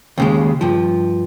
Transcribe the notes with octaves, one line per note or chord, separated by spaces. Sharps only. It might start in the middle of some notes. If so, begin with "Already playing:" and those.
D#2 C#3 G#3
G2 F3